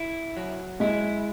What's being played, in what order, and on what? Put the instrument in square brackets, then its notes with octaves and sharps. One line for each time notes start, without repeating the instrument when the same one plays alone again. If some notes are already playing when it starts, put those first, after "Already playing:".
Already playing: [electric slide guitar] E4
F#3
[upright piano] G#3 [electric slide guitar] E4